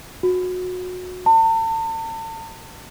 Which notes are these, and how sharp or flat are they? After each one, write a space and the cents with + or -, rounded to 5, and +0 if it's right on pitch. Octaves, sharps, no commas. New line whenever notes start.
F#4 -25
A5 +40